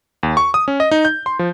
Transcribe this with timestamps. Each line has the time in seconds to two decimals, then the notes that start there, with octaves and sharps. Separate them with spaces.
0.23 D#2
0.37 C#6
0.54 D#6
0.68 C#4
0.80 D#5
0.91 D#4
1.05 G6
1.26 C6
1.39 F3